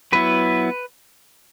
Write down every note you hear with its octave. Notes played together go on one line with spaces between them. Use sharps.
F#3 B3 E4 B4